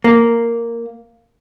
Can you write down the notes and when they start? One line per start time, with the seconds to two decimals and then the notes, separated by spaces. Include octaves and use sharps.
0.04 A#3